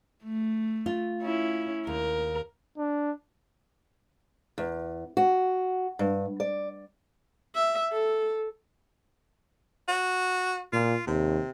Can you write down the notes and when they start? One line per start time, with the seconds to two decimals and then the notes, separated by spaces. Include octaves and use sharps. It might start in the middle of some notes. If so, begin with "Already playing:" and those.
0.24 A3
0.86 F4
1.22 C#4 E4
1.87 D#2 A#4
2.78 D4
4.58 E2
5.17 F#4
5.99 G2
6.40 D5
7.54 E5
7.92 A4
9.88 F#4
10.73 A#2 F4
11.07 D#2 C3